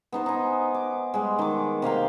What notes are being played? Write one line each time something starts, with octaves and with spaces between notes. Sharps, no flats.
B3 D#4 C5
D#4 G#5
D6
G3 G#3
D#3 D6
C3 A#3 F5 G5